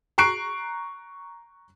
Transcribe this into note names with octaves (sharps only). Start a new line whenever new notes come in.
A#5 C#6 F#6 C7 D7